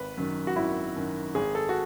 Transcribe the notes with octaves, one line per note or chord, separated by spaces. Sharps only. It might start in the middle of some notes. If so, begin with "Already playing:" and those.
Already playing: G#1 B4
F#2 D#3
F#4
G#1 E4
F#2 D#3
G#1 G#4
A4
F#4